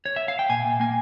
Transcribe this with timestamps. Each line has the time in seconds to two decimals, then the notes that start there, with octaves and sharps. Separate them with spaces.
0.06 C#5
0.16 E5
0.28 F5
0.39 G5
0.49 A#2 G#5
0.65 A#2
0.80 A#3 G#5